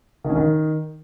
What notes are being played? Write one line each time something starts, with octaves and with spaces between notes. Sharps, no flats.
D#3
C#4
D#3